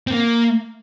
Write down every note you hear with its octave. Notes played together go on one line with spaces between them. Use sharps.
C4
A#3